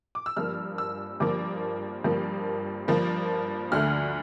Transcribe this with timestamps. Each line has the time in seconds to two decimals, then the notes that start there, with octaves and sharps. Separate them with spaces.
0.15 D6
0.26 E6
0.37 G2 F3 A#3 F6
0.78 E6
1.20 G2 F3 A#3 D6
2.04 G2 F3 A#3
2.88 G2 F3 A#3
3.72 D2 D3 A3 F6